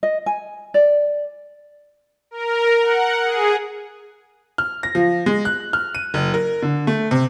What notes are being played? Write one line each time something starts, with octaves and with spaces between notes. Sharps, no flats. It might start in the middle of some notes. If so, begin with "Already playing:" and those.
D#5
G#5
D5
A#4
F#5
G#4
F6
A#6
F3
G#3
F#6
F6
D#7
F#1
A#4
D3
A3
C3